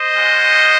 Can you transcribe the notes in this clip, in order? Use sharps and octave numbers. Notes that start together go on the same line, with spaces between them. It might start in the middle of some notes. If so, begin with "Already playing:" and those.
Already playing: C5 D#5
G#3 C#4 F#4